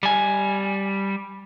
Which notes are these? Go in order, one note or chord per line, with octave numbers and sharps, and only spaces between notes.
G3 G#5